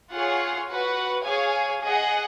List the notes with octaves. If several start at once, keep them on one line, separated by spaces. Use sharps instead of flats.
F4 G#4 C#5 F#5
F#4 B4 F#5
G#4 C#5 F5 G#5
G#4 D#5 F#5